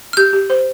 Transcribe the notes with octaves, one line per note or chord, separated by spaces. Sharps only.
F6
G4 G6
G4
C5